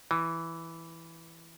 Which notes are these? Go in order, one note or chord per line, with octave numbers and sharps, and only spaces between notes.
E3